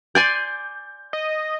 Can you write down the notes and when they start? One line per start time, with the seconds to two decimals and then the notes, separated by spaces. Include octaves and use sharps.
0.15 D5 G#5 C6 G6
1.13 D#5